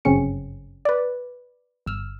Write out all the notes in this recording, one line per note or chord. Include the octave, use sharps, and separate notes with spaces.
G1 F#2 C#3 C4 C#4 C#7
B4 D5
G1 E6 F6